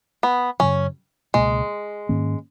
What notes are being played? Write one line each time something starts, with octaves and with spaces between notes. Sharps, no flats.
B3
F#2 C#3 F#3 C#4
C#2 B2 G#3 A#3
G#2 D#3 A#3 C#4